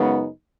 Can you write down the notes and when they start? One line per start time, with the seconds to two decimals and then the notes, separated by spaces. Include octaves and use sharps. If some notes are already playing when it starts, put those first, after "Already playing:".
Already playing: F#2 C#3 G#3 B3 D#4